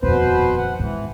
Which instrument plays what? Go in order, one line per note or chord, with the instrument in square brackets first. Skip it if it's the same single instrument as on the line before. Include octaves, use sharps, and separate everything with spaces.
[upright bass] D#1 F2 [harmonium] B2 B4 C5
[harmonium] F#5
[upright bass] G#2 [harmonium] E3